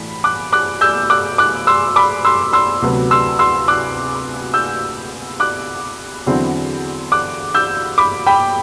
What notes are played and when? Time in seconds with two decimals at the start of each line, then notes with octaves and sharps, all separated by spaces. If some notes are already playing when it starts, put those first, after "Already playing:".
Already playing: A2 E3 A3 B5
0.24 D6 F#6
0.52 D6 F#6
0.81 E6 G6
1.10 D6 F#6
1.38 D6 F#6
1.67 C6 E6
1.96 B5 D6
2.25 C6 E6
2.53 C6 E6
2.82 D2 C3 F#3 B3
3.11 C6 E6
3.39 C6 E6
3.68 D6 F#6
4.54 E6 G6
5.40 D6 F#6
6.26 E2 D3 F#3 C4 E4
7.12 D6 F#6
7.54 E6 G6
7.98 B5 D6
8.26 G5 B5